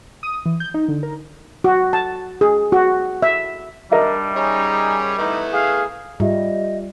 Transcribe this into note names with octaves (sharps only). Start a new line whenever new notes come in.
D#6
E3
G6
D#4
D3
A#4
F#4
A5
G#4
F#4
E5
G3 D4 A#4 D#5 E5
C#4 D#4 G#4 C#5
A3 B3 D#4 E4
G#4 F5
G#2 G3 F4 G4 D#5 E5